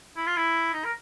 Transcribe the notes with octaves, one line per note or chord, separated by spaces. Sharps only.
E4
F4
E4
D#4
A#4